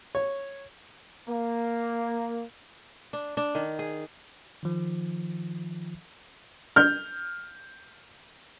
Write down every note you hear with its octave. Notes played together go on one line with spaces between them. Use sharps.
C#5
A#3
D4
D4
D#3
G#4
D#3 F3
F6 G6